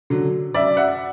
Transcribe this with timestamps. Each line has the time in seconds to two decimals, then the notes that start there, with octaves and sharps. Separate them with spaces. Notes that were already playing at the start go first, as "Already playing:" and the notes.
0.10 D3 F#3
0.54 F#2 D5 E5
0.77 E5 F#5